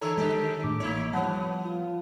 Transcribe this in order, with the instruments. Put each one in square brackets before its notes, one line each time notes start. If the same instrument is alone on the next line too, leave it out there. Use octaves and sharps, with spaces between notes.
[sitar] D3 E3 C#5 [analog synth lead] A4 [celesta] A#5 E6
[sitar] D3 G4 [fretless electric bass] D#3 G#3
[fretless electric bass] A2 [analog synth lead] D6
[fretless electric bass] A1 A#3 [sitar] D#4 E4 C#5
[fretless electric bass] F3 G3 [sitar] B3 [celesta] C#5 A5 [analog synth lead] F#5
[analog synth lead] F4